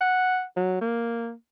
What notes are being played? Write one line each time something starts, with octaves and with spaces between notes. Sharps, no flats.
F#5
F#3
A#3